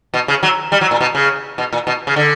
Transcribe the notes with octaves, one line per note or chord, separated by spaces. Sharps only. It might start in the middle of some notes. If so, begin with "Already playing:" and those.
B2
C#3
F#3
G3
F#3
A#2
B2
C#3
B2
A#2
B2
C#3
D3